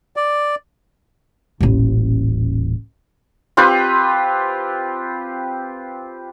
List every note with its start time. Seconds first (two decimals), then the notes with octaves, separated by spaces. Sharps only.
0.16 D5
1.61 D#1 A1
3.57 C4 F4 G4 B4